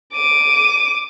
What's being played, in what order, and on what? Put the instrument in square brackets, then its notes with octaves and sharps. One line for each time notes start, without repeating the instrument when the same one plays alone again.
[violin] D6 D#7